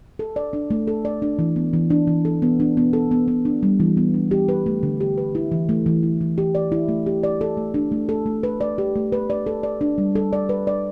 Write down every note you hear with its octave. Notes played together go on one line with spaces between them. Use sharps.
A4
D5
D4
A3
A4
D5
D4
E3
B3
E3
D4
E3
A4
B3
D4
B3
A4
B3
B3
D4
G3
E3
B3
D4
G4
B4
A3
D3
G4
B4
E4
E3
A3
E3
E4
E3
G4
D5
E4
A3
G4
D5
A4
A3
D4
A3
A4
A3
B4
D5
G4
A3
B4
D5
A4
D5
D4
G3
A4
D5
B4
D5